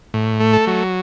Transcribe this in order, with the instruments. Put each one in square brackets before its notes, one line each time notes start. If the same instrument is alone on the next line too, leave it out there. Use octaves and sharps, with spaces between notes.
[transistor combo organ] A2
A3
A4
F#3